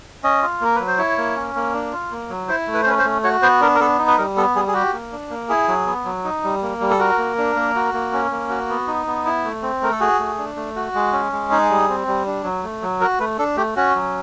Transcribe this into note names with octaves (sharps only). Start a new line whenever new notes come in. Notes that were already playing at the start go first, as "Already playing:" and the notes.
C#4 D#5
F4
A#3 A#4
F#3 B4
C5
E4 C#5
A#3
C#4
A#3
D4
F4
A#3
F#3
E4 C5
A3
B4
C5
C#4 B4
C5
A3
F#4 C#5
B3 C5
D4 A#4
A#4
B3 A4
D#4
B4
G3 A#4
B3 A4
G3 G#4
G#4
F#4 G4
A#3
D4
A#3
E4 G#4
F#3
B3
F#3
D#4
G3
A#3
G3
A4
F#4 A#4
A#3
D4
A#3
F#4
A#3
C#4
A#3
F#4
B3
D#4
B3
E4
A3
C4
A3 A#4
A4
F#4 G#4
A3
D4
A3
F#4
G#3
C#4
G#3
D#4 G#4
G3
C4
G3
D4
F#3
A3
F#3
F#4 A#4
A3 B4
D4 A4
A3 G4
C#4 F#4
F#3